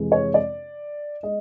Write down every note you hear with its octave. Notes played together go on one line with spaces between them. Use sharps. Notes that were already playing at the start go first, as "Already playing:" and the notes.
Already playing: F2 C3 E3 G#3
C#5
D5
G#3 D#5